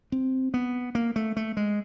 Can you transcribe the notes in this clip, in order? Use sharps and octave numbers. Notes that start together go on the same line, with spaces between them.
C4
B3
A#3
A3
A3
G#3